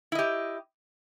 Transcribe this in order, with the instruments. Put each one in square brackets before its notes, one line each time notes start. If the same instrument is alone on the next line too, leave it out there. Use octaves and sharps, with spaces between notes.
[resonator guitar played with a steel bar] E4
D#5
G4